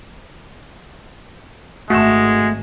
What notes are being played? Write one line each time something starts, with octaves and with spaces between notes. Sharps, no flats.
G#1 G#3 A3 F#4 E7